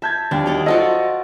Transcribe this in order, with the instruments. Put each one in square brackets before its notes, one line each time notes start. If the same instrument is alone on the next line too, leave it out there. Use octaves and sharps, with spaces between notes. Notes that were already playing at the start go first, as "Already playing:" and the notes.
[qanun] E5 [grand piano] A5 G6 G#6
[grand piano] D#2 G3 G5 [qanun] D4
[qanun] F#3 D#4 D5
[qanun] F4 F#4 D5 [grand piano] A4 C5 D#5